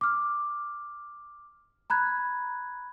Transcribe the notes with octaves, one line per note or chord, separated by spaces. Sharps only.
D6 F6
A#5 B5 F#6 G#6